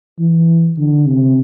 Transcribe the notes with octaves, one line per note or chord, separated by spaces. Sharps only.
E3
D3
C3